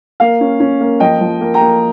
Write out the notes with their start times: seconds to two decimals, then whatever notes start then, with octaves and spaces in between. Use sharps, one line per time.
0.20 A#3 F5
0.41 C#4
0.60 C#4
0.81 A#3
1.00 F3 D#5 G5
1.21 F3
1.41 A#3
1.54 G5 A#5
1.61 A#3